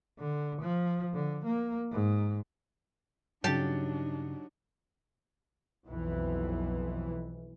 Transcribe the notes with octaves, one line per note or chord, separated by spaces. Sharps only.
D3
F3
D3
A#3
G#2
G2 C#3 F#3 D4 D#4 G4 A5
B1 F2 E3